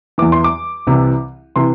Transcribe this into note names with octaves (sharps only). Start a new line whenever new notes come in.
E2 E3 D6
C6
D6
C2 C3 E3
C3 E3 C6